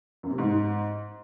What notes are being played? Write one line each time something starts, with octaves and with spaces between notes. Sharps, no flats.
F#2
C3
G#2